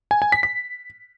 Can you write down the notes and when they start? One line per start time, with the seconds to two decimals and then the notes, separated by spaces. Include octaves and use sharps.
0.11 G#5
0.22 G#5
0.32 B6
0.43 B6